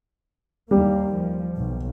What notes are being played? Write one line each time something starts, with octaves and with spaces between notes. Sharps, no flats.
D#2 G3 A#3
F3
B1